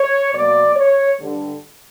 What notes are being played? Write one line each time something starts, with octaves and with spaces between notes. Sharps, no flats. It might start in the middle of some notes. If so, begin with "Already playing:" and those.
Already playing: C#5
B2 F#3 A#3 D5
C#5
G2 D3 G3